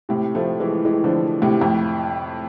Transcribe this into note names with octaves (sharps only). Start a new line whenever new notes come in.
A2 C3
F3 A3
E3 G#3
E3 G#3
D3 F3
A2 C3
F2 A2